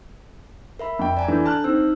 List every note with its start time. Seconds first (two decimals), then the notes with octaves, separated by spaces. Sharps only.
0.79 A#4 E5 B5
0.99 F2 G5
1.17 D5 G#5 A#5
1.28 E3 D4 A4 G6
1.46 A5 F6 F#6
1.64 C4 D#4 E6